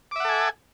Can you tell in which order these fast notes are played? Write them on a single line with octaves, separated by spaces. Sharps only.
D6 E5 F#5 A4 G#5